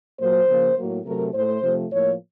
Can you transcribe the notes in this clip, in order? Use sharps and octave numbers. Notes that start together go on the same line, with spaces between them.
A#2 F#3 A#3 C5
C#3 F3 A#3
A2 F#3 A#3
C3 F#3 A3 A#4
A2 A3 C5
C3 F3 A3
A2 F3 A#3 C#5